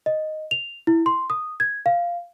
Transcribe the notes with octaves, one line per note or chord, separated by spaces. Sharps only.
D#5
F7
E4
C6
D#6
G#6
F5